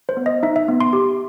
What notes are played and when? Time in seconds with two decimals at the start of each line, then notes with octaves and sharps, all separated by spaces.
0.09 C5
0.17 B3
0.26 D#5
0.43 D#4 E5
0.56 E5
0.68 B3
0.80 C6
0.93 G4